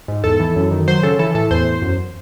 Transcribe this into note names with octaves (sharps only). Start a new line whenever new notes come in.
G#2
E2 A4
E3
F#2
D#3
F#3 C5
C#3 A4
E3 A4
A2 A4
E2 C5
E2
F#2